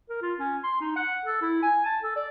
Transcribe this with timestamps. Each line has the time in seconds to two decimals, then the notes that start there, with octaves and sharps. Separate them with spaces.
0.09 A#4
0.21 F4
0.39 C#4
0.63 C6
0.81 D#4
0.96 F#5
1.25 A4
1.41 E4
1.62 G#5
1.85 A5
2.03 A4
2.16 D5